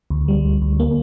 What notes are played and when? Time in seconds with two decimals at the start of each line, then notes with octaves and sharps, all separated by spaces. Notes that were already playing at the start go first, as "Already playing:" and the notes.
0.10 D2
0.28 G3
0.45 D2
0.62 D2
0.80 A#3